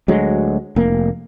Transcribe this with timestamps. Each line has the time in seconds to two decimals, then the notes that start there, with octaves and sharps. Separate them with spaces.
0.08 D2 F#3 G#3
0.76 F1 A#3